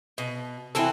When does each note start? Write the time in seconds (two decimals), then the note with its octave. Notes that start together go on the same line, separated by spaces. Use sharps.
0.18 B2
0.75 E3 C4 E4 F#4 A4